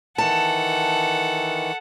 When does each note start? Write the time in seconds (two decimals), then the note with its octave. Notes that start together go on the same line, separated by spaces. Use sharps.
0.18 D#3 E3 A4 F#5 A5